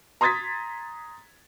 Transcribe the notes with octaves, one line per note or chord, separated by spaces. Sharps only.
A#5 C6 D#6 G#6 A6 B6